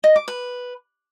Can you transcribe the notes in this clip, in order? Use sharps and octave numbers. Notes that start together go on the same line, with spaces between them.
D#5
D6
B4